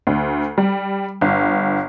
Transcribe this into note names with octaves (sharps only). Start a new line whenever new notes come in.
D2
G3
G1